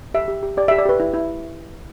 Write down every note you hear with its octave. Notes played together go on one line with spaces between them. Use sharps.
G4 E5
G4
G4
G4 D5
E5
G4
D5
G4 B4
E4
E4